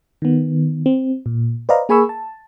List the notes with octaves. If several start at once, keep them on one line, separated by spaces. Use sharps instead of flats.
D#3 B3
C4
A#2
B4 C5 D5 D#5 F5 A#5
A#3 G#4 G#5 B5 C#6 E6
A5